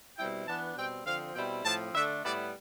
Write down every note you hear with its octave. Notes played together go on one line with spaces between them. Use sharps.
B2 G3 C4 E4 G5
E3 B3 D4 A5
B2 G3 C4 G5
D3 F3 C4 F5
B2 G3 C4 E4 G5
A2 F3 C4 A5
D3 A3 D4 E5
A2 G3 B3 E4 D5